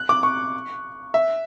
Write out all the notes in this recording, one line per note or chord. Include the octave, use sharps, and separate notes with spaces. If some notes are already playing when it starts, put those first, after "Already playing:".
Already playing: F#6
D6
C#6
E5